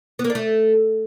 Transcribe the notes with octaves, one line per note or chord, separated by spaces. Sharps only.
B3
A#3
D4
A3